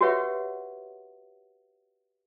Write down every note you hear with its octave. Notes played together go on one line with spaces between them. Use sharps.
F#4 G4 B4 C#5 E5 F#5